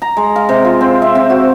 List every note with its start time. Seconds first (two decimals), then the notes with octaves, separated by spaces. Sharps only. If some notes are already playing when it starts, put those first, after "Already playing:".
0.02 A#5
0.17 G#3
0.36 F5
0.49 C3
0.65 F4
0.81 C4
1.02 E5
1.15 C4
1.30 F#4